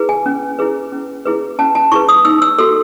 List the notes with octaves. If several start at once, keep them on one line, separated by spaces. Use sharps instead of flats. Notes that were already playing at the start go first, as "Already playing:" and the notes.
Already playing: E4 G#4 B4
G#5
C#4
E4 G#4 B4
C#4
E4 G#4 B4
C#4 A5
A5
E4 G#4 B4 C#6
D#6
D#4 E6
E6
F#4 A4 E6